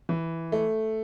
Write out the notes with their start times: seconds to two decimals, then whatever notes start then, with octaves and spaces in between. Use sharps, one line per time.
0.09 E3
0.52 A3